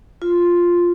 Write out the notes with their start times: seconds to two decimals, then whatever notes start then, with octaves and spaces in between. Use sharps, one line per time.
0.22 F4